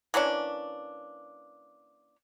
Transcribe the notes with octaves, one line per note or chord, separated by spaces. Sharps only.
E3 A#3 C#4 D4